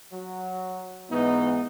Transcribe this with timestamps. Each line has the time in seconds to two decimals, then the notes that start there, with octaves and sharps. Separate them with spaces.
0.12 F#3
1.10 G#2 E3 B3 D#4